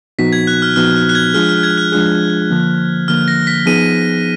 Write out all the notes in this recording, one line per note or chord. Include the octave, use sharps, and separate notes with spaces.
A#2 F3 B3 D#4 F#4 B6
G#6
F#6
F6
A#2 F3 B3 D#4 F#4 F6
F#6
F#6
G#6
F3 G#3 D4 F4 G#4 F6
F6
G#6
F#6
F3 G#3 D4 F4 G#4 F#6
D3 F3 A#3
D3 F3 A#3 F6
A#6
B6
F3 B3 D#4 G#4 D#7